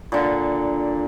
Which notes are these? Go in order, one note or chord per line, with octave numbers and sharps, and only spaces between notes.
A#2 D3